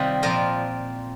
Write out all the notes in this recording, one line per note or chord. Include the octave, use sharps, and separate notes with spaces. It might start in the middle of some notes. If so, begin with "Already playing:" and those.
Already playing: C3 D#3 G3 F4
A#2 F3 C4 A#4